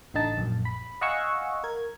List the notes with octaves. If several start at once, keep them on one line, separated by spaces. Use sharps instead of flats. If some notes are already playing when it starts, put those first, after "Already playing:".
A1 D3 D#4 A5
A#1 F#2
B5
D#5 F5 F#5 G#5 C#6 E6
A#4 G#6